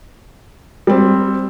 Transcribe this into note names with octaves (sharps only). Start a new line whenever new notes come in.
G3 C4